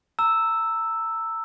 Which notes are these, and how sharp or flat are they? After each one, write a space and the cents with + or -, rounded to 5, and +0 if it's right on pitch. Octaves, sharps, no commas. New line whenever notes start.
A#5 -30 E6 +0